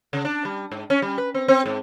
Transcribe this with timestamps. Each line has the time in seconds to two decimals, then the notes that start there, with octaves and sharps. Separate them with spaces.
0.13 C#3
0.25 D4
0.45 G3
0.72 G#2
0.90 C#4
1.02 G3
1.18 B4
1.34 C4
1.48 C4
1.66 G#2